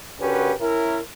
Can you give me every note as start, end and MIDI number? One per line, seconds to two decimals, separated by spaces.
0.21 0.53 50
0.21 0.53 61
0.21 0.53 66
0.21 0.53 67
0.21 0.53 70
0.21 0.53 71
0.60 0.99 61
0.60 0.99 64
0.60 0.99 70